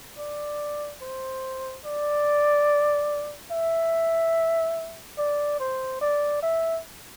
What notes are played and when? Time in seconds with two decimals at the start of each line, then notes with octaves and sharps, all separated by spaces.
0.19 D5
1.02 C5
1.85 D5
3.52 E5
5.18 D5
5.60 C5
6.01 D5
6.43 E5